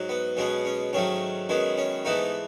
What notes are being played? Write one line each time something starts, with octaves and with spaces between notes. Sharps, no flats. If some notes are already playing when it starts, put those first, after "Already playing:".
Already playing: G#2 F#3
B3
B1 B2 G#3 B3 C#4
C#4
G#2 D#3 F#3 A3 C#4
F#2 D#3 G#3 B3
C#4
G#2 E3 A3 B3 D#4